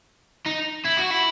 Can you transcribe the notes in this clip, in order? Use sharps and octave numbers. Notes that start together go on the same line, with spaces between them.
D#4
E4
F#4
E4